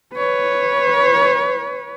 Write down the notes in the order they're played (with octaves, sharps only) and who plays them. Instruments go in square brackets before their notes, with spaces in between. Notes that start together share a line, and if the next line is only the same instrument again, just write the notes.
[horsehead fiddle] B4 C#5